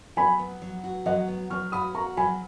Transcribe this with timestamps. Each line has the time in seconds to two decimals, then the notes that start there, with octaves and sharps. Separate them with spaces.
0.17 F#3 G#5 B5
0.39 B3
0.62 F#3
0.84 F#4
1.06 F#3 D#5 F#5
1.28 B3
1.50 F#3 C#6 F6
1.72 F#4 B5 D#6
1.95 F#4 A#5 C#6
2.17 F#3 G#5 B5